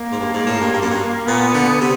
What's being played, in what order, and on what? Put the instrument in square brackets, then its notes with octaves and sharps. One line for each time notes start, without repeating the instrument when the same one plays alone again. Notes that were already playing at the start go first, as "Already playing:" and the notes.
Already playing: [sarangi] A#3
[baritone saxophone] G#2
G2
G#2
A2
G2
G2
F#2
G2
[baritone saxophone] A#2 [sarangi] B3
[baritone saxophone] D3
C3